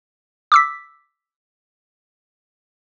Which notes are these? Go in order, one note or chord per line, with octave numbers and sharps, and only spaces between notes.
D6 E6 B6